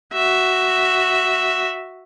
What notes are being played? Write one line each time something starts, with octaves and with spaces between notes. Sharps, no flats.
F#4 E5